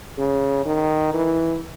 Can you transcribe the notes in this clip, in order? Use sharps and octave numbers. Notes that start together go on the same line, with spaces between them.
C#3
D#3
E3